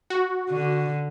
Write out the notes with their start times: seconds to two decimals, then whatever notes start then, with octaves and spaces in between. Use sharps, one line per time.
0.10 F#4
0.50 D3